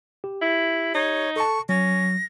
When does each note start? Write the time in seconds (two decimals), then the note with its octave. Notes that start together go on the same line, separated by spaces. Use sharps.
0.24 G4
0.41 E4
0.94 D#4 C#5
1.36 A4 A5 C#6
1.69 F#3 C#4 A#6